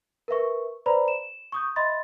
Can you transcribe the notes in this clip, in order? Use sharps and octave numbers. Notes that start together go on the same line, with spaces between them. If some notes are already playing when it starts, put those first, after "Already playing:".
A#4 B4 E5 C#6
B4 C5 D5 A#5 B5
E7
C#6 D#6 G6
D#5 E5 B5 C6 A6